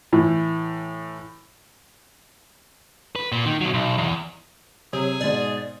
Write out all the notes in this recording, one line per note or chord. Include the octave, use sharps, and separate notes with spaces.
A2 E3
B4
A#2
D#3
B2 F#3
B1
E2
C3 F#3 G#4
G#2 B2 D5